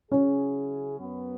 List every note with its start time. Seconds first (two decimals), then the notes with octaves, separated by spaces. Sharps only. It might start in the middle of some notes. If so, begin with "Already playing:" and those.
0.11 C#3 F#3 C#4 E4 G#4
0.99 F#2 F#3 B3